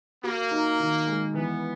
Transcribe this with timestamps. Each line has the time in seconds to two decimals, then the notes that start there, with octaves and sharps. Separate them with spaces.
0.24 A#3 F#4
0.51 D#4
0.79 D#3
1.07 G#3
1.34 E3 B3